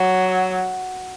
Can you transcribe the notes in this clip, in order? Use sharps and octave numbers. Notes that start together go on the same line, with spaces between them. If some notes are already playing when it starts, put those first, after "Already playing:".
Already playing: F#3